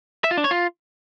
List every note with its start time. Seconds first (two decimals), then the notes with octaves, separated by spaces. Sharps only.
0.24 E5
0.31 F4
0.38 D4
0.44 C#5
0.51 F4